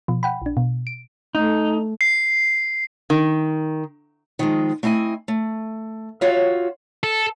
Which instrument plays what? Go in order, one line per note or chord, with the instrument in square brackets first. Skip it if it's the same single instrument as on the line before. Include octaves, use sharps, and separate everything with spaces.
[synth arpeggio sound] B2 F3
F#5 G5 B5
A#1 D4
B2
D7
[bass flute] A3 [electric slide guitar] D#4
[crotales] C7
[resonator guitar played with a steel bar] D#3
[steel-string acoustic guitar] D#3 F3 G#3
A3 C4 E4 D#5 G#5
A3
F4 F#4 C#5 E5
[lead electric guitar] A4